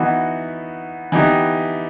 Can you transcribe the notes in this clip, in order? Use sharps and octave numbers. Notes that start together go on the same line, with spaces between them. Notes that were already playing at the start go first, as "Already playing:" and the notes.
Already playing: E3 B3 D#4 F#4
E3 B3 D#4 G4